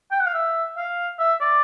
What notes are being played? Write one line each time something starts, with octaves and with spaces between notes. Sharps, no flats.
G5
F#5
F5
E5
F5
E5
D5